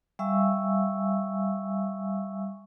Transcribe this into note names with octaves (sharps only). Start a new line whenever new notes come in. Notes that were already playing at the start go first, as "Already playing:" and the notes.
G3 E5 F5 G#5 C#6 E6